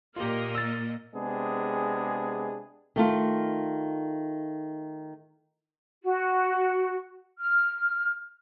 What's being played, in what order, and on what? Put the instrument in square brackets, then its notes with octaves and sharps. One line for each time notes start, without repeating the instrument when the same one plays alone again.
[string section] A#2 A#3 D#5 [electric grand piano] F4 G4 [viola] A#4
[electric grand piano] E6 A6
[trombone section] C3 G#3 B3 D4 G#4
[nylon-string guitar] D#3 A3 F4
[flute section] F#4
F6